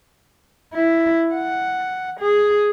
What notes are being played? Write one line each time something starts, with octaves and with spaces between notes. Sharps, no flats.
E4
F#5
G#4